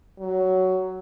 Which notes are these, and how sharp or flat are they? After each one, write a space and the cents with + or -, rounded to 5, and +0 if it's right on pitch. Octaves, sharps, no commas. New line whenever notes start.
F#3 +10